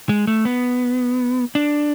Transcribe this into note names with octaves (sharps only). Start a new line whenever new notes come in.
G#3
A3
B3
D4